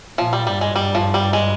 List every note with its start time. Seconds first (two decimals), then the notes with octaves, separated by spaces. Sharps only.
0.18 A#2 F3
0.33 G3
0.47 G2 G3
0.61 G#3
0.76 G3
0.95 F3
1.14 G3
1.33 G#3